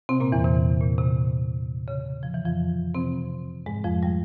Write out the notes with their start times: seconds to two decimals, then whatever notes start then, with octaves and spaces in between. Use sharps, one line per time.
0.09 C3 C4
0.20 A#2 A#3
0.32 E2 E3
0.44 C3
0.81 A#2
0.98 C3
1.88 C#3
2.23 F3
2.34 E3
2.45 F2 F3
2.95 C3 C4
3.66 G#2 G#3
3.84 F2 F3
4.03 G3